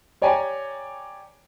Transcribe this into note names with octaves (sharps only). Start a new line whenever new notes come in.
G4 C#5 D5 G5 G#5 A#5